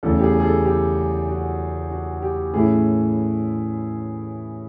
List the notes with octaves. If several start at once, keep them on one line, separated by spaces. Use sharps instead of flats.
E2 C#3 E3 A3 A4
G4
G#4
G#4
A4
G4
F#4
F#4
G4
A2 E3 A3 C#4 E4 G#4